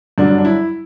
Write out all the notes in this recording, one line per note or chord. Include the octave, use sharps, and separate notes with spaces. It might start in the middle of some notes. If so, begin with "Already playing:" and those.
G2 D3 F#3 D4
D4
E4